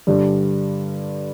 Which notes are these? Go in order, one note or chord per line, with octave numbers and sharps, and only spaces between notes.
G2 D3 G3 D4